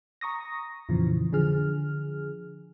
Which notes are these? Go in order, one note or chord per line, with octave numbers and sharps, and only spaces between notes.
A#5 C#6 D#6 A#6
F2 A#2 C#3 E3 F3
D3 F3 G#4 F6